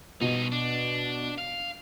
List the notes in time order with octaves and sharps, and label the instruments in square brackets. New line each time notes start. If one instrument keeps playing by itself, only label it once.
[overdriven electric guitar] G2 D#4 [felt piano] B2
[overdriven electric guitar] D4
F5